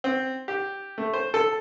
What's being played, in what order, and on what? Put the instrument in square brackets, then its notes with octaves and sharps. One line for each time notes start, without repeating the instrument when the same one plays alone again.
[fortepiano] C4
G4
A3
C5
A4